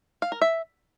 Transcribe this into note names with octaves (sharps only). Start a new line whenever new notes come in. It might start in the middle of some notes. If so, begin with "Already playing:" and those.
F5
A#4
E5